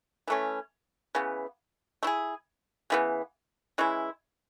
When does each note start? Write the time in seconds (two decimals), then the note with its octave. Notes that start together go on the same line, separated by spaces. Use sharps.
0.27 E3 A3 C#4
1.15 C#3 E3 B3
2.03 A3 E4 G#4
2.90 C#3 E3 B3
3.78 E3 G#3 C#4 E4